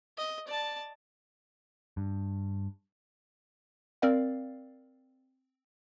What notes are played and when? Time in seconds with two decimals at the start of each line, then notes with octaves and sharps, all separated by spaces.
0.18 D#5
0.48 D5 A5
1.97 G2
4.02 C4 A#4 D5 F5